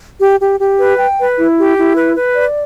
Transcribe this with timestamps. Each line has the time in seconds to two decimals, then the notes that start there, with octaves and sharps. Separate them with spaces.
0.20 G4
0.40 G4
0.59 G4
0.78 B4
0.98 G5
1.18 B4
1.37 E4
1.57 G4
1.77 E4
1.97 B4
2.15 B4
2.35 D5